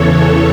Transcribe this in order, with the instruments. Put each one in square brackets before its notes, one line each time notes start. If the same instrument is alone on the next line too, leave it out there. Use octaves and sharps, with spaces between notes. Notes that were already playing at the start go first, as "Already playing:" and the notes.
Already playing: [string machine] E2 C#3 E3 A4 C#5